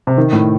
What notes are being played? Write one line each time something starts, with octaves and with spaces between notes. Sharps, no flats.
C3
D#3
A2